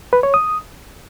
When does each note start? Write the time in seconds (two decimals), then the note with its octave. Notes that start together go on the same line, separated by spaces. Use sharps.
0.13 B4
0.23 C#5
0.34 D#6